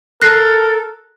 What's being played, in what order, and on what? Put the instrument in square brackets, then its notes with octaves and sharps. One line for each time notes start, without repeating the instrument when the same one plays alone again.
[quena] A4 [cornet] A#4 [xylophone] F#6 A#6 C7